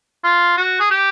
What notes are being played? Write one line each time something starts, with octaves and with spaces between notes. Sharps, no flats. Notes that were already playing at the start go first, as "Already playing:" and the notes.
F4
F#4
G#4
G4